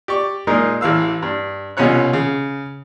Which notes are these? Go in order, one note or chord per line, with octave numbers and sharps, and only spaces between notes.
G4 D5 C#6
A#2 G#3 D#4 A#4
A1 E3 F5 E6
G2
C2 B2 C#4 F4 C#5 F#6
C#3